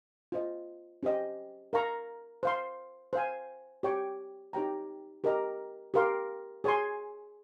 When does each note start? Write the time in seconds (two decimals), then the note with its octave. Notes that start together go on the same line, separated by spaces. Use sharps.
0.32 F4 C5 D#5
1.03 C#4 G4 C5 D#5 G5
1.73 A#4 F5 A#5 C#6
2.43 C5 F5 C6
3.13 C5 F5 G#5
3.83 G4 C#5 G5 C#6
4.53 D#4 G4 C#5 G5 A#5
5.24 G4 A#4 D#5 A#5
5.94 G4 A#4 F5 C6
6.64 G#4 C#5 G#5 C6